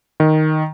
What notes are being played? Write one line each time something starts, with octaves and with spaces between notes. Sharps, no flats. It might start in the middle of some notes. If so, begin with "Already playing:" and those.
D#3